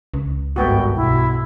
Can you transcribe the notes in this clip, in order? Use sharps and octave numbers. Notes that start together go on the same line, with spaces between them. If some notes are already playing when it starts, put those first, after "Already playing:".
C#2
G#1 G2 A3 B3 F#4 G5
B1 E4